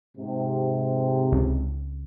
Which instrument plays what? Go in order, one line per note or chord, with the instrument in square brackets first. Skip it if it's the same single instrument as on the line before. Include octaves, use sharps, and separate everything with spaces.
[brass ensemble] G#2 C3
[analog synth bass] C#2